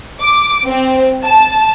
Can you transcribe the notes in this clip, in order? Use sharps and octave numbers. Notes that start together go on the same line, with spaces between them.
D6
C4
A5